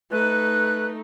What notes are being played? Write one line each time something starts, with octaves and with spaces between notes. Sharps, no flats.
A3 D#4 B4 F#6